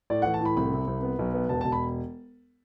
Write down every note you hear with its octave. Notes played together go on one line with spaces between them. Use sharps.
A2 D5
E3 F#5
A5
A2 B5
C2 B5
C3
C2
B3
B1
B3
E1 A5
E1 A5
B5